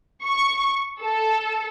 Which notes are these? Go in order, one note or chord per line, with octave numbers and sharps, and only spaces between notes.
C#6
A4